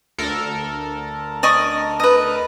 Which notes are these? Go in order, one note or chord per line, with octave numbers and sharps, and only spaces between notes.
D2 A4 A#4
D5 D#5 C#6
B4 D#5